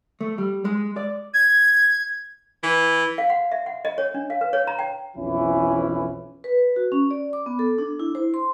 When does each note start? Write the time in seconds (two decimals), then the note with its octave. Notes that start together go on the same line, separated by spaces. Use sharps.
0.21 A3
0.38 G3
0.65 G#3
0.96 D5
1.34 G#6
2.63 E3
3.18 F5
3.30 F#5
3.52 E5
3.66 F#5
3.85 D#5
3.98 C#5
4.14 D4
4.30 F5
4.41 B4
4.53 C#5
4.67 A#5
4.79 G5
5.17 B1 F2 E3 C#4 E4
6.44 B4
6.76 F#4
6.92 C#4
7.11 D5
7.33 D6
7.46 B3
7.59 A4
7.78 D4
8.00 E4
8.15 C5
8.34 C6